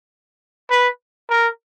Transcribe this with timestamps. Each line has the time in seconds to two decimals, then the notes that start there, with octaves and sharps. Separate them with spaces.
0.70 B4
1.30 A#4